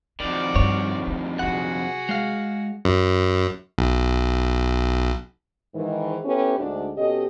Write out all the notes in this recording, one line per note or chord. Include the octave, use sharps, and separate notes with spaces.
F2 D#3 F#3 F#4 D5
G2 C#5
A3
C3 F#3 F#4 G#4 F#5
G#3 F5
F#2
B1
G#2 D#3 E3
B3 C#4 E4 G4 A4 B4
D2 G#2 D4
B2 C#4 G4 A4 D#5